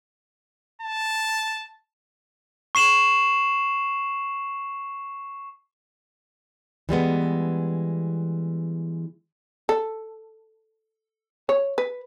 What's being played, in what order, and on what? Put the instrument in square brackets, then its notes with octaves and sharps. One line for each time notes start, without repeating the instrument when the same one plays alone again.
[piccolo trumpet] A5
[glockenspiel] C#6 C7 E7 F#7
[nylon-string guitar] E3 G3 G#3 B3
[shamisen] A4
C#5
B4